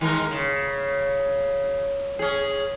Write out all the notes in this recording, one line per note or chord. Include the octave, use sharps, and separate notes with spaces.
D#3 G#3 A#4
C#3
C#4 G#4